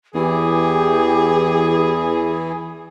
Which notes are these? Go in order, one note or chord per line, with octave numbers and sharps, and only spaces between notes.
E2 E3 G4 G#4